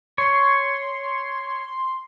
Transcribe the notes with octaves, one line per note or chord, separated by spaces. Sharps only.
C#5 C6